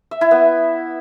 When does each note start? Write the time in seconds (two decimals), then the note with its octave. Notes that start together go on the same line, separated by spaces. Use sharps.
0.11 E5
0.21 E4
0.31 B3